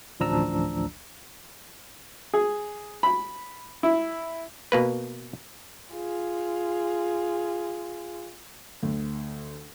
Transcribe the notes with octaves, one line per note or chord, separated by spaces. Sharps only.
A1 D2 F3 D4 A#5 E6
G#4
B5
E4
B2 A#3 B4
F4 G#4
D2